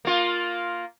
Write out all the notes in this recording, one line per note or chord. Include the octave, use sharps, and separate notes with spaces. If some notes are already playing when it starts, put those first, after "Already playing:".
A#3 F4